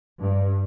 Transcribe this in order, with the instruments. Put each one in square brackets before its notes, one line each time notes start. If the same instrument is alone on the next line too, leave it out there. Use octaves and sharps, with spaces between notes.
[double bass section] G2